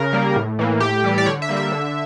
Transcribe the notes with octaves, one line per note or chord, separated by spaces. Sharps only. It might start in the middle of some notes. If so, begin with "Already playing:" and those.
Already playing: C#3 A#4
G3 A#3
A2
E3 A#3
A2 G4
E3 G3
D5
D3 C#5
E5
G3 A#3
E5
D3